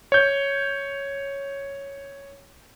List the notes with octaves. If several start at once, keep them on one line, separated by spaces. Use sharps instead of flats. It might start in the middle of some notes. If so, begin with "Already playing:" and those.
C#5 G6